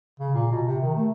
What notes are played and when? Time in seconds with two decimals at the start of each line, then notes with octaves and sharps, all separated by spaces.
0.20 C#3
0.34 A#2
0.52 B2
0.67 C3
0.82 D#3
0.95 A3